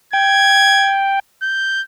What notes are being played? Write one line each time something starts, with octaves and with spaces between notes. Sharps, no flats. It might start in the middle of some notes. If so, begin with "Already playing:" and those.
G5 G#6
G6